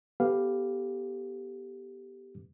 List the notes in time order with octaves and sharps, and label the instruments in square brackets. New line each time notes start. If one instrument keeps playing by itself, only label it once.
[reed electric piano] B3 G4 A4 B4 F5